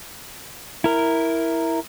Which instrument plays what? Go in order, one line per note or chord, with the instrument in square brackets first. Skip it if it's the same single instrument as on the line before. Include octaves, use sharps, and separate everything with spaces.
[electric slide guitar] E4 A#4